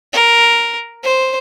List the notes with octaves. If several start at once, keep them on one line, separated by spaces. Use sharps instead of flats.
A#4
C5